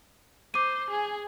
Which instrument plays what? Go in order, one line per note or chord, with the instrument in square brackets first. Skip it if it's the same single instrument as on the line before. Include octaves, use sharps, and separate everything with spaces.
[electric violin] C5 [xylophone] D6 D#7
[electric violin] G#4 G#5